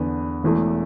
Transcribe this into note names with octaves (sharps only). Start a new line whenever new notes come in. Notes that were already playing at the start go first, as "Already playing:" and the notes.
Already playing: E2 D3 B3
E1 E2 E3 A3